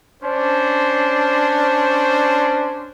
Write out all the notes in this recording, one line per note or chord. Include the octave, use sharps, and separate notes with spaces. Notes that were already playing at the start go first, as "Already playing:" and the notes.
C#4 D4 C5